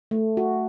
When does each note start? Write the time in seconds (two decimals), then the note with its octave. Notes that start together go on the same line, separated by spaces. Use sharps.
0.11 A3
0.37 F#4